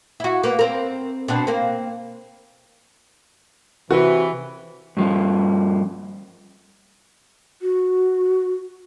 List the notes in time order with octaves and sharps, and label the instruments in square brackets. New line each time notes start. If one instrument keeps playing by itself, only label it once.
[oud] E4 F#4
A#3 B3
C4 A#4
B2 C4 D4
A#3 C4
[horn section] C3 E3 [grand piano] F#4
[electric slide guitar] G2 F3
[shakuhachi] F#4